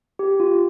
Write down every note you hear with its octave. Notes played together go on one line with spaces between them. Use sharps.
G4
F4